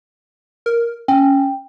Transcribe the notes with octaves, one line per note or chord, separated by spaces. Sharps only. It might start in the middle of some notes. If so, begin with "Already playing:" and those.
A#4
C#4 G5